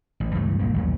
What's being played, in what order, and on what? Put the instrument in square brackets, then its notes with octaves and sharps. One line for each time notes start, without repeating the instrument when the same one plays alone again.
[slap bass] A1
C#2 G2 E3 A3
A#1 A#3
A1 D#2 F#3